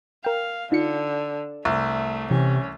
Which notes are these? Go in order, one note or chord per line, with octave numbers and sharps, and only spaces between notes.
A#4 F5 G5
D3 D#4 F4 C#7
C2 A3
C3 E3 C#4